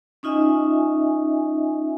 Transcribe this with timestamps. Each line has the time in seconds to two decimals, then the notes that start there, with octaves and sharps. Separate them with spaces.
0.23 C#4 D#4 F4 D#5 E5 G#5